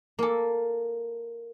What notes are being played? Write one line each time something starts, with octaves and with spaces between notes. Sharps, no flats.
A#3 A4